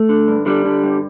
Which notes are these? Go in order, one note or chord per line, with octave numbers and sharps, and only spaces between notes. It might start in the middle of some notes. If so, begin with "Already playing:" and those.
Already playing: A3
D3
G2
D3 G3
D3
G2